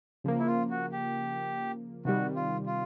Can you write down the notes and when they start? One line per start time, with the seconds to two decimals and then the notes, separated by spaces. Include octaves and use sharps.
0.24 C#3 F3 A#3
0.39 E4
0.47 F4
0.70 F#4
0.92 G4
2.05 C3 D#3 G3 F#4
2.36 F4
2.66 F4